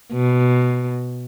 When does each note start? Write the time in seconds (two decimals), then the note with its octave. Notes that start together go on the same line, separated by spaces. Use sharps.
0.13 B2